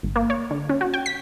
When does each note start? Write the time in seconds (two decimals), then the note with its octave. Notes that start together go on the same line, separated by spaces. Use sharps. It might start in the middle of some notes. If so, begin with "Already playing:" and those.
0.03 G#1
0.16 A#3
0.30 C#5
0.51 D3
0.69 C#4
0.81 F#4
0.94 G5
1.06 B6